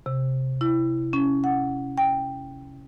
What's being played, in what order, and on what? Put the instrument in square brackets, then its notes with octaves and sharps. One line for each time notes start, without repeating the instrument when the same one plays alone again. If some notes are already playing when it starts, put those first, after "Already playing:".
[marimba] C3
E4
C#4
F#5
G5